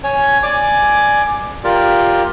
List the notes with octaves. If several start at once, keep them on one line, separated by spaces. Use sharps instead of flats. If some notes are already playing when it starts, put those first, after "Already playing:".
C#5 G#5
D5 G#5 D6
F4 G4 A#4 D5